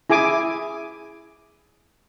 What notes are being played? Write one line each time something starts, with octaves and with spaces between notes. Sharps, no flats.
E4 G#4 G#5 D6